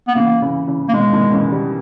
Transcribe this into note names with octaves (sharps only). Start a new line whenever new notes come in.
B3
C#3 E3 A#3
C#3 E3
C#3 E3
A#3
B2 D#3 G#3
B2 D#3
C#3 E3
D#3 G3